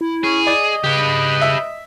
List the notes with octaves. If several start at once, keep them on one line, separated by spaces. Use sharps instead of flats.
E4
C#4 G#4
D5 D#5
C#3 G4 B4
E5